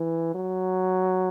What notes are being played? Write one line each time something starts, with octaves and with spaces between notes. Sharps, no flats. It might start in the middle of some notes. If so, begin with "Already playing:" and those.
Already playing: E3
F#3